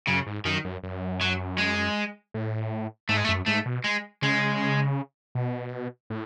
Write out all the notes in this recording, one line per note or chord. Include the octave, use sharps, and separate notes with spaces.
F#2 C#3
G#2
F#2 D#3
F#2
F#2
F#3
G#3
A2
G#2 A3
G#3
A3
F#2
G#2 A3
B2
G#3
C#3 G#3
B2
A2